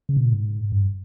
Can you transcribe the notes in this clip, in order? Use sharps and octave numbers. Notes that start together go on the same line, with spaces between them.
C#3
B2
A#2
G#2
G2